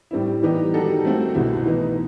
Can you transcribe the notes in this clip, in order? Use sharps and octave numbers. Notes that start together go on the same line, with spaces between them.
A2 G3 C4 E4
E3 G3 B3 D#4 G4
D#3 G3 D#4 F#4 A4
D#3 A3 C4 F#4 A4
C2 B2 A3 E4
E3 B3 D#4